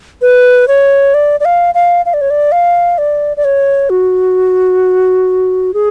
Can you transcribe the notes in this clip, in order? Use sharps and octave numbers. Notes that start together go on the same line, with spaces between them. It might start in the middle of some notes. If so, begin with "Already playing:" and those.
B4
C#5
D5
D5
F5
F5
F5
D5
C#5
D5
F5
D5
D5
C#5
F#4
G#4